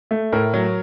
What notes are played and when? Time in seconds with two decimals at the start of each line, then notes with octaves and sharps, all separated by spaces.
0.11 A3
0.33 A2 A#4
0.54 F#3